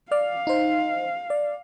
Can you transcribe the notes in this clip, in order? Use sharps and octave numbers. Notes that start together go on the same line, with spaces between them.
D5 F5 F6
D#4 C5
D5